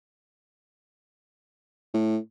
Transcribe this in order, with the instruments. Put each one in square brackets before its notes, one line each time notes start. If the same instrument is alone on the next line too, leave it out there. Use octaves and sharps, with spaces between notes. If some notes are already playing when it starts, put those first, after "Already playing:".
[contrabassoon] A2